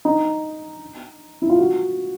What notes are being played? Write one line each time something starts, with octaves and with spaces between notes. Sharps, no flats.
D#4
E4
F4
F#4